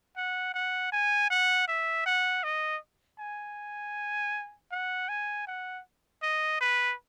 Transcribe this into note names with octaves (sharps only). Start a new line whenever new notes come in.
F#5
F#5
G#5
F#5
E5
F#5
D#5
G#5
F#5
G#5
F#5
D#5
B4